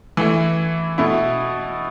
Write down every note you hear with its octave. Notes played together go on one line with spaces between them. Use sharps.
E3 A3 E4
B2 A3 E4